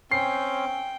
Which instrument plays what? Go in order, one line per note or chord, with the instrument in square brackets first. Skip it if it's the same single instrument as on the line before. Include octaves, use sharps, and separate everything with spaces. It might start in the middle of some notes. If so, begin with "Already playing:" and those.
[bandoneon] C4 C#4 [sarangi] G5 [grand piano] C7